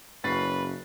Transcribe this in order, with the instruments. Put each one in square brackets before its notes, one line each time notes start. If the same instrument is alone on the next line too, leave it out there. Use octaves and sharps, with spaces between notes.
[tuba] F#1 [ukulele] C#4 [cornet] B4 [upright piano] A6 C7